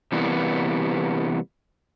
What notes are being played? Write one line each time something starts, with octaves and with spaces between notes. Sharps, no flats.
C3 E3 G3 A#3 B3